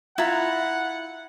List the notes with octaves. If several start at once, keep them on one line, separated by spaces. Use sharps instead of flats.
E4 F4 F#5 A#5